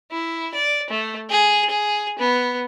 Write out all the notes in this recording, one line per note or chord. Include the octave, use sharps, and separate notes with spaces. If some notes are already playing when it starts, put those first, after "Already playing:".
E4
D5
A3
G#4
G#4
B3